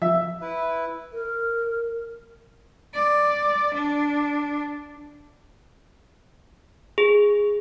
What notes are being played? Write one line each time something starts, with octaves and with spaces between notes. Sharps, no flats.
F3 E5
E4 B4
A#4
D5
D4
G#4